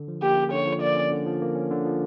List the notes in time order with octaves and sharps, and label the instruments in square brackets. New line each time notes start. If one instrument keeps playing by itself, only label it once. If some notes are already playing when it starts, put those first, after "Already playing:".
Already playing: [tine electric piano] D3
F3
[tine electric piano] A#3 [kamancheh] G4
[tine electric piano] C#4
[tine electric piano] D3 [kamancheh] C#5
[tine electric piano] F3
[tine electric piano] A#3 [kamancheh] D5
[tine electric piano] C#4
D3
F3
A#3
C#4
D3
F3